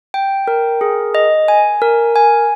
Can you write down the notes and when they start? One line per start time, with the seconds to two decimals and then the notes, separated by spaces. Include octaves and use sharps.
0.14 G5
0.48 A#4
0.81 G#4
1.15 D#5
1.48 G#5
1.82 A#4
2.16 G#5